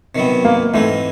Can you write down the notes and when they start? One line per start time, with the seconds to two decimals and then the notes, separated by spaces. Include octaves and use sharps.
0.15 C3 D#3 F#3 B3
0.44 A#3
0.74 G#2 E3 G#3 A3 C4